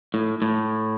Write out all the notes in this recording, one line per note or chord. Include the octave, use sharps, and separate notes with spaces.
A2
A2